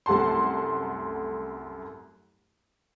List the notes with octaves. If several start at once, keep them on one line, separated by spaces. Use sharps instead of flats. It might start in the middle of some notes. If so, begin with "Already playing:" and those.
C2 F#2 A3 F#5 A5 C6